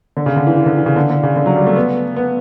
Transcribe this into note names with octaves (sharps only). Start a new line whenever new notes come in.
D3
C#3
D3
E3
E3
D3
E3
C#3
D3
D3
C#3
D3
F#3
G3
A3
B3
B3